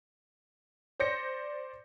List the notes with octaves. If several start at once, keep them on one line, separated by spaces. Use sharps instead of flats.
C5 D5 G6 A#6 C#7